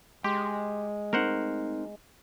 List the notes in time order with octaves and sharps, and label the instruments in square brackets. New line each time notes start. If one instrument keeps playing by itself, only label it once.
[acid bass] G#3 [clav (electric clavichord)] G4 [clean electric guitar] C6
[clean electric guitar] A3 C4 D#4 [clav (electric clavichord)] A#4 C5 F#5